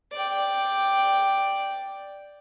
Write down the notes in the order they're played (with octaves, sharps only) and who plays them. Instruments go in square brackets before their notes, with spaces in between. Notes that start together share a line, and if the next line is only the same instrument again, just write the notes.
[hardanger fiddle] D5 G5